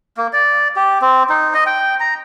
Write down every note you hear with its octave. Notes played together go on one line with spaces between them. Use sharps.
A#3
D5
G4
C4
D#4
D#5
G5
A#5